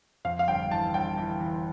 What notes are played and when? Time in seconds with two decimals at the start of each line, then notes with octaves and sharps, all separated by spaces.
0.25 F2 F5
0.39 F5
0.48 G1 G5
0.71 E3 A5
0.94 G1 G5
1.18 E3
1.40 E3